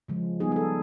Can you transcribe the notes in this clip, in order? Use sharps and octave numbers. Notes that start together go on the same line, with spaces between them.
C#3 F3 G#3
G3 B3 D#4 G#4
G#4
A4